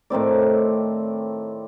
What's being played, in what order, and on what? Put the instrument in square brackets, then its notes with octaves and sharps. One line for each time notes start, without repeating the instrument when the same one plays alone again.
[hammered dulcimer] A2 D#3 C4 D5